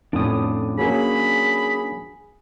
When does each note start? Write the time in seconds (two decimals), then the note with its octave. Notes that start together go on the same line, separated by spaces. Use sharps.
0.13 F2 A2 C#4 D4 D#6
0.79 F#3 A#3 C#4 G#4 B5